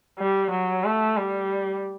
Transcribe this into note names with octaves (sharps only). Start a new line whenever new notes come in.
G3
F#3
A3
G3